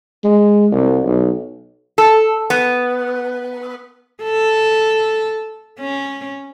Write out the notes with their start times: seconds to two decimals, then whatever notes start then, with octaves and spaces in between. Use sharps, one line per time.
0.24 G#3
0.72 C2
1.04 B1
1.98 A4
2.50 B3
4.23 A4
5.80 C#4